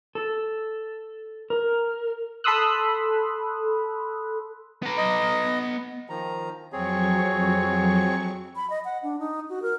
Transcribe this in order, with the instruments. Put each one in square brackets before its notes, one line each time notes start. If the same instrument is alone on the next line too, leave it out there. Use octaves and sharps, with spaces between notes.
[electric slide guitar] A4
A#4
[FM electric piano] A4 B5 C6 D#6 E6 F#6
[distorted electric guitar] B3 A#5
[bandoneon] D#5
D#3 F3 A#5
[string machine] F2 F#3 C#6 [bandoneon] C4 G#4 C#5
[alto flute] B5
D#5
F#5
D4
D#4
F#4
A#4